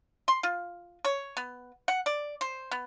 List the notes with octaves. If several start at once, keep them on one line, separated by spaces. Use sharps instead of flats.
C6
F4
C#5
B3
F#5
D5
C5
B3